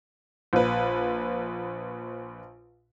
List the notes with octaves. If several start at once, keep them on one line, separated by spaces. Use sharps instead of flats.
A#1 B4